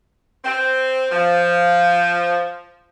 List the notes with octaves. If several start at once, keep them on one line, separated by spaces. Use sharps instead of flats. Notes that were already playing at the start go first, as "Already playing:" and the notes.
C4
F3